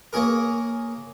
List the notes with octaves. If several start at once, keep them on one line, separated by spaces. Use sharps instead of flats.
A#3 C#4 G#4 A#4